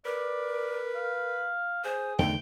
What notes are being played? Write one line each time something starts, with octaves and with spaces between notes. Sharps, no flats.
A#4 B4 D5
F5
G#4 C5
E2 D3 A3 D#4 G5